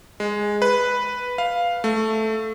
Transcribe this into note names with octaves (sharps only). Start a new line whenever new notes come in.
G#3
B4
F5
A3